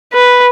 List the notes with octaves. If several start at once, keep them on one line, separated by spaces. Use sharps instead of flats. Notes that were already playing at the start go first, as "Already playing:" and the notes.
B4